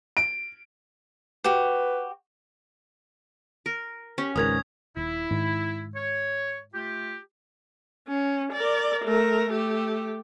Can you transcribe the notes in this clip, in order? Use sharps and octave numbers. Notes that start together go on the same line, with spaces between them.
D7
F#4 G4 B4
A#4
C#4 G4
G#1 C#2 G#2 F#4 A#4 B4 D#6 G#6
D#1 E4
G#2 D#3
C#5
A3 F4 G4
C#4
A#4 D5
A3 A#4
A3 G4